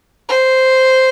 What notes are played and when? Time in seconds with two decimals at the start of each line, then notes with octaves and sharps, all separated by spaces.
0.29 C5